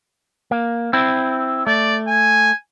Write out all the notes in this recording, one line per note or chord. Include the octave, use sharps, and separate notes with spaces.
A#3
C4 E4
A3 D5
G#5